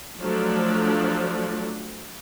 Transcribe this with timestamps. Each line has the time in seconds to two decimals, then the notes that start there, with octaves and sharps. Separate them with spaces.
0.20 F3 F#3 A3 D4